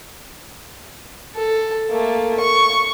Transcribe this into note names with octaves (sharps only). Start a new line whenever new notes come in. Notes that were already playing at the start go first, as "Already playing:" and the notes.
A4
A3 A#3
C#6